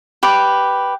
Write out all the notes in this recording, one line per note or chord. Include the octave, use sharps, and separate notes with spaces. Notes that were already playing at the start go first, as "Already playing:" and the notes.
G4 B4 D6